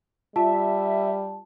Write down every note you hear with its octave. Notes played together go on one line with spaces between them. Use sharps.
G3 F4 E5 A5